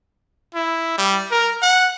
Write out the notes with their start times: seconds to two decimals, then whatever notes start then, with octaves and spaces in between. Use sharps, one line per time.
0.55 E4
0.98 G3
1.31 A#4
1.62 F#5